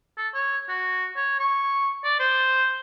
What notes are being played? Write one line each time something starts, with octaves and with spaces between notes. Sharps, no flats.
A4
C#5
F#4
C#5
C#6
D5
C5